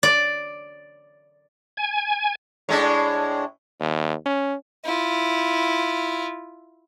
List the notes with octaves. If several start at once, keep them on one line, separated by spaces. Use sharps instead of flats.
D5
G#5
A2 G#3 D4
D#2
C#4
E4 F4